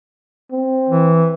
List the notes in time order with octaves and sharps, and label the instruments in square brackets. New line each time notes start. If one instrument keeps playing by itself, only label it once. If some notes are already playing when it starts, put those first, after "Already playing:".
[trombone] C4
[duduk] E3